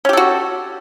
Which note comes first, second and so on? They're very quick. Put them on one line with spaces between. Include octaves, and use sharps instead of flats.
C#4 G4 A4 F#4